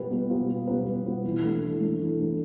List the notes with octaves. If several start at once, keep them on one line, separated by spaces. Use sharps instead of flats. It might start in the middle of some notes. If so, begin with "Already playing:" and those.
Already playing: B2 G3 B3 F4 B4
B2
G3 B3 F4 B4
B2
G3 B3 F4 B4
B2
G3 B3 F4 B4
E3
A3 D4 A4
E3
A3 D4 A4
E3
A3 D4 A4